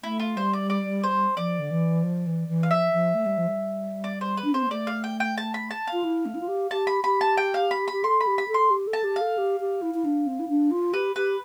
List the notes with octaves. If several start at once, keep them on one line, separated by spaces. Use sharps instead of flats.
A3 E4
F4
G3 C5
D5
D5
C5
F3 D5
D3
E3
F3
E3
E3
F5
F3 E5
F3
A3
G3
F3
G3
D5
C5
B4
D4
C4 C5
B3
A3 D5
F5
G5
G5
A5
B5
A5
F5
F4
E4
A3
E4
F4
G4
G4 A5
B5
G4 B5
A5
G5
F5
B5
G4 B5
A4 C6
B5
G4
B5
A4
C6
G4
A4
A5
G4
A4 F5
G4
G4
E4
E4
D4
C4
E4
D4
F4
G4 B4
G4 B4